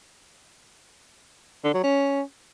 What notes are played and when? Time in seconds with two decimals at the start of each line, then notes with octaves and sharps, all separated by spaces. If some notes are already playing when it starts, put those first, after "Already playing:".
1.64 D3
1.74 F#3
1.84 C#4